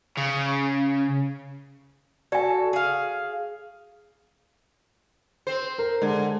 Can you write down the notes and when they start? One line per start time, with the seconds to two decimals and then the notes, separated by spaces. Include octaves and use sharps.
0.17 C#3
2.32 F#4 A4 D5 G#5
2.73 G#4 F5
5.47 C4 C5
5.78 A#4
6.02 D3 G#3